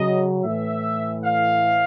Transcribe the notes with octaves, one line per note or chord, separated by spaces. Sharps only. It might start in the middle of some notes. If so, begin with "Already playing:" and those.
Already playing: C#3 F#3 D#5
A2 E3 E5
F5